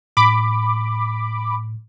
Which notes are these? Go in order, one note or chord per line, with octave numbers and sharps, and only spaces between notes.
A2 B5 D6